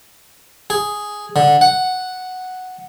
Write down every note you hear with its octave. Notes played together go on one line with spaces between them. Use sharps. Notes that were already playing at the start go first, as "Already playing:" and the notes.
G#4
D3
F#5